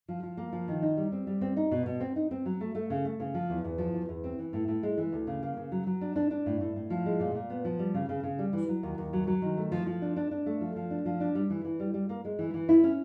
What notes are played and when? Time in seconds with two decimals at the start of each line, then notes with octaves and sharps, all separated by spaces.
0.08 F3
0.23 F3
0.37 A#3
0.52 F3
0.68 D#3
0.82 D#4
0.97 G3
1.12 C4
1.27 G3
1.41 C4
1.57 D#4
1.71 B2
1.86 B2
2.00 C4
2.16 D#4
2.31 C4
2.46 F#3
2.61 A3
2.75 A3
2.90 C#3
3.05 A3
3.20 C#3
3.34 F3
3.50 E2
3.64 E2
3.78 F3
3.94 E2
4.09 E2
4.24 C4
4.39 E3
4.53 A2
4.68 A2
4.83 G#3
4.97 E3
5.12 D2
5.27 C#3
5.43 A#3
5.57 C#3
5.72 F#3
5.87 F#3
6.01 D4
6.16 D4
6.31 D4
6.46 A2
6.61 A2
6.76 A2
6.90 F3
7.06 G#3
7.20 A#2
7.35 A#2
7.50 B3
7.65 F3
7.79 G3
7.94 C#3
8.09 C#3
8.24 C#3
8.39 G3
8.53 E3
8.69 F#3
8.83 D#2
8.98 D#2
9.13 F#3
9.27 F#3
9.42 D#3
9.57 A3
9.72 F3
9.87 F3
10.02 D4
10.16 D4
10.31 D4
10.46 A3
10.61 F3
10.76 F3
10.91 D4
11.06 F3
11.20 D4
11.35 G3
11.50 E3
11.65 E3
11.80 G3
11.94 G3
12.09 A#3
12.25 G#3
12.39 E3
12.54 E3
12.69 E4
12.84 C#4